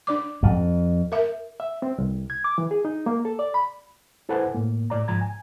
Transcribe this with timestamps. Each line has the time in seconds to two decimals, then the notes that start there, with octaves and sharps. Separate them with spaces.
0.07 D4 D5 D6
0.43 F2
1.12 A#4 E5
1.60 E5
1.82 C4
1.98 C2
2.30 G#6
2.44 D6
2.58 E3
2.71 G#4
2.85 D#4
3.06 A#3
3.25 A4
3.39 D5
3.54 B5
4.29 E4 A4 B4 C5 F#5 G#5
4.55 A2 A#3
4.90 A2 D5 A#5
5.08 G#2 F3 A#5 G#6
5.21 G#5